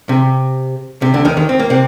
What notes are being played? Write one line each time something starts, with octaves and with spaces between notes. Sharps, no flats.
C3
C3
D2 D3
D#2 D#3
D#2 D#3
C4
A#3
C3 C4